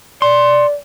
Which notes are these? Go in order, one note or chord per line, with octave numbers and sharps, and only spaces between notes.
D5 C6